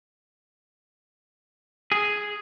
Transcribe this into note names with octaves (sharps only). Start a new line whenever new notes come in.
G#4